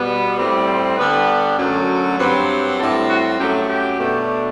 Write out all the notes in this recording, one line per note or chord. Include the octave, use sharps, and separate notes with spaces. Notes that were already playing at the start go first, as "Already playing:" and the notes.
Already playing: B2 G3 B3
A2 G3 C4
C5
D3 G3 B3 D4 B4
F#2 D3 F#3 A3
G2 F#3 C4 B4
A2 G3 C4 A4
F#4
F#2 F#3 A3 G4
G4
B2 A3 D4